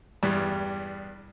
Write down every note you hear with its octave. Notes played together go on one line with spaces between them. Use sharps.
E2 G2 G3